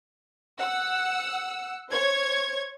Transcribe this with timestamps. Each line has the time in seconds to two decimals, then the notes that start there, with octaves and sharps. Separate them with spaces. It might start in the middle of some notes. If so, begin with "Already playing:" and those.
0.57 F#5 E6
1.89 C5 C#5 C#6 G#6